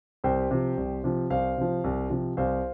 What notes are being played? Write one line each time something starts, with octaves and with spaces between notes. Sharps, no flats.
C2 G4 C5
C3 F3
C2
C3 F3
C2 C5 F5
C3 F3
C2
C3 F3
C2 C5 F5